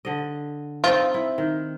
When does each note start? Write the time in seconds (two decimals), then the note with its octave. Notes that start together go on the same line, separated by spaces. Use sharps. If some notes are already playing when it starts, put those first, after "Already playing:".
0.05 D3 D#5
0.84 C4 D#4 F4
1.14 E4
1.38 D#3